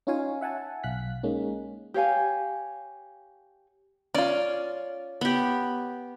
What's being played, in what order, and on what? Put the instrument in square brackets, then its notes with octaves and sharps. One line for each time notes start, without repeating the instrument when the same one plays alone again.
[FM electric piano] C#4 D#4 F4 C#5 F5 G#5
E5 F#5 G#5 A5
B1 F5 F#6 B6
G#3 A#3 C#4 D#4
[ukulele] G4 C#5 F5 G#5
[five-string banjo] C#4 F4 [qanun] D5
[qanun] B3 G4